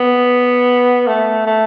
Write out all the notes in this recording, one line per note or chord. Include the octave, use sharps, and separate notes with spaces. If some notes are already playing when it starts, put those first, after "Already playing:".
Already playing: B3
A3
A3